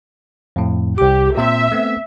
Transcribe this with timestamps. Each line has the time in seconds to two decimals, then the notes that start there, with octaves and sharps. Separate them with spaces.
0.56 F2 A2
0.98 C2 G4 D6
1.37 A#2 C4 C5 E5
1.72 A3 B3 C4